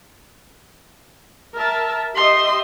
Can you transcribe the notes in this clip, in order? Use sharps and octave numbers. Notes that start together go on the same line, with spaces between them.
A#4 E5 A5
G4 D#5 E5 C6